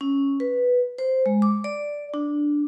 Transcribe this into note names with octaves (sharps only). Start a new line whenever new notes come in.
C#4
B4
C5
G#3
D6
D5
D4